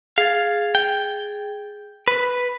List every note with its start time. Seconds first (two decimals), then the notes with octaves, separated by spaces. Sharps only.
0.18 G#4 F5 G#6 A6
0.75 G5
2.08 B4 B5